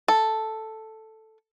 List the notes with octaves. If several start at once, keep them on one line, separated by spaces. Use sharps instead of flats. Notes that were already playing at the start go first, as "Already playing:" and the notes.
A4